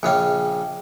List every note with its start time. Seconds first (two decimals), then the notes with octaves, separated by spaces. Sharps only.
0.03 A#1 C#3 C#4 G#4 G5